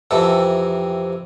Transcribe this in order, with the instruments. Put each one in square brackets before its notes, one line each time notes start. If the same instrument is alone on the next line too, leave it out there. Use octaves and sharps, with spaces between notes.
[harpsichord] F2 C3 E3 A4